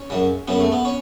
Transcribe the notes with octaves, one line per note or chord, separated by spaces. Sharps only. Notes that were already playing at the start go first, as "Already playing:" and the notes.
Already playing: C#4
F#2 C#3
F#2 C#3 B3
A3
B3
C#4